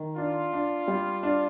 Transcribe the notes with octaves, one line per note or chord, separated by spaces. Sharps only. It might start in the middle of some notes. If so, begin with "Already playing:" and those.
Already playing: D#3
D4 F4
D4
G3
D4